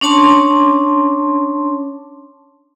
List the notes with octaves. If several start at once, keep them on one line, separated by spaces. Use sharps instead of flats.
C#4 D4 C#5 A5 C6 D6